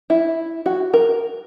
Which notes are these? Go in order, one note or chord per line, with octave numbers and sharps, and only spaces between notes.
E4
F#4
A#4